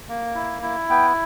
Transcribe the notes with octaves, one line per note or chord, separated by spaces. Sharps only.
A#3
E4
E4
B3 G5